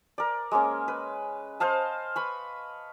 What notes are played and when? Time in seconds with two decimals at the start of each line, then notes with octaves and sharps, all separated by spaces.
0.18 A#4 D5
0.51 G#3 A#3 C#4
0.88 B4
1.60 C5 D#5 F5 A5
2.16 B4 B5 C#6